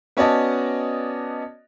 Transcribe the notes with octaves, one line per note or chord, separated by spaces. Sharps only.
B3 C#4 F#4 D5 D#5 A5